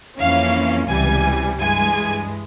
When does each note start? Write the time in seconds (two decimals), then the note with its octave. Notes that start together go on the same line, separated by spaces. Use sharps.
0.19 F2 E3 A#3 C#4 F5
0.89 C#2 C3 E3 G3 G#5
1.59 G2 E3 G#3 G#5